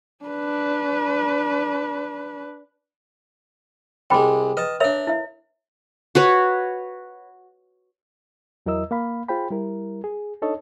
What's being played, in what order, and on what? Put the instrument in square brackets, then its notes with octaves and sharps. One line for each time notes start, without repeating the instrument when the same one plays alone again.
[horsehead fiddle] D4 B4
[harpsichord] C2 G#3 [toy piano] G5 B5 D6
[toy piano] B4 [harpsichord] D#5 A5
[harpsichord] D4 A#5 [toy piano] A#4 C#5 E5
[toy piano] E4 E5
[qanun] F#4 B4 C#5
[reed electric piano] E2 F#3 E4 A#4 D#5 E6
A#3 F5 B5
F4 G#4 C5 G5 B5
G3 E4 A#4
G#4
D4 D#4 A4 C#5 D#5